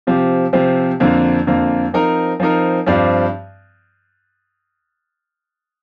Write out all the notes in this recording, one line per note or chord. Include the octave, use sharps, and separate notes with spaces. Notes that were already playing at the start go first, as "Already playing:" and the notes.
C3 F3 C4 G4
C3 F3 C4 G4
F2 D3 F3 A#3
F2 D3 F3 A#3
F3 C4 D#4 A#4
F3 C4 D#4 A#4
G2 F3 C4 G4 D5